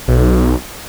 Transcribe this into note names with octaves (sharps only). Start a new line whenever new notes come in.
B1